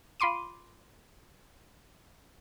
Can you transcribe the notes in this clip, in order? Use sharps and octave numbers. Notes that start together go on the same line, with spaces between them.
F4 B5 C6 D6 D#7